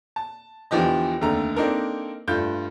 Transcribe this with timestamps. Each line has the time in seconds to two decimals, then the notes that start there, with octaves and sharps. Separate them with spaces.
0.16 A5
0.71 E2 D3 E3 F3 G4 D#5
1.21 F1 D#2 D3 A3 A#5
1.56 A#3 C4 D4 D#4 A4 A#4
2.28 G2 A3 F4 G6